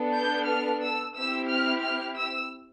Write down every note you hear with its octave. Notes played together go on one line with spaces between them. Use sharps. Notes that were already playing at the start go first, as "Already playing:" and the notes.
Already playing: B3 D4 A4
G6
F6
E6
C4 E4 G4 E6
F6
F6
E6